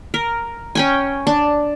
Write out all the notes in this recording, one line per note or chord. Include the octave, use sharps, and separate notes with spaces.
A#4
C#4 G5 G#5
D4